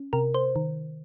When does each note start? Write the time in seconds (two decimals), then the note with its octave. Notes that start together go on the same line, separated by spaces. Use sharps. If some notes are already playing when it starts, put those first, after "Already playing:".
Already playing: C#4
0.13 C3 A#4
0.34 C5
0.56 D#3